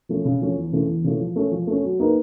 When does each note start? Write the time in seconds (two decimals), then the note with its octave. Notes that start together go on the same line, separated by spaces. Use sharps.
0.09 F3 A3 C#4
0.25 C#3
0.41 F3 A3 C#4
0.57 E2
0.72 C#3 E3 A3 C#4
0.88 E2
1.04 C#3 E3 A3 C#4
1.20 F3
1.36 A3 C#4
1.52 F3
1.67 A3 C#4
1.83 F#3
1.99 A#3 D#4 G#4 B4